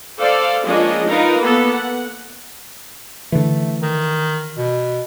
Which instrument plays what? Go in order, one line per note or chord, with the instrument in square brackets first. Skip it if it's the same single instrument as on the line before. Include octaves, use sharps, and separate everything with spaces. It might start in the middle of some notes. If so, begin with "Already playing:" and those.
[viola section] A4 C5 D5 F5
F3 G#3 A#3 C#4 D4 D#5
D#4 F4 A#4 B4 F5
A#3 B3 A4
F#5
[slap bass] D3 E3 [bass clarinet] A3
[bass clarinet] D#3
B2